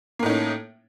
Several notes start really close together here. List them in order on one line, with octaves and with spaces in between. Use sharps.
A#3 A2 D#4 C#4